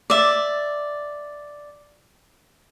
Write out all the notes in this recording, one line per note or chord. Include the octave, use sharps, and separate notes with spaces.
D5 E5